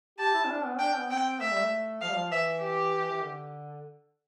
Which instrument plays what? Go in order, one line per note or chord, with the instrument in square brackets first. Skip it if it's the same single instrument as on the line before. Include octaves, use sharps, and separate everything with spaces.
[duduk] G4 [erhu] A5
[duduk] E4
C4
D4
B3
[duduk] D4 [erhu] G5
[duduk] B3
[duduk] C4 [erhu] G5
[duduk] A3 [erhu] E5
[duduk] G3
A3
[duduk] F3 [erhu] F5
[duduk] G3
F3
[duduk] E3 [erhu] E5
[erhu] G4
[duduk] E3
D3